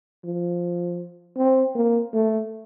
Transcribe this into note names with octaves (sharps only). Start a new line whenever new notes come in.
F3
C4
A#3
A3